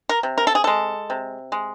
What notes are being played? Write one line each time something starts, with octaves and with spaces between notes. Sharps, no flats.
A#4
C3
A#4
A4
G#4
G#3 A4
C3
G#3